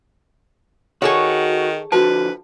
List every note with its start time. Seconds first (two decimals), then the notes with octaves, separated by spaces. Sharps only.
1.02 D#3 F#4 G#4 A4 C#5
1.92 D3 F3 F#4 B4 A5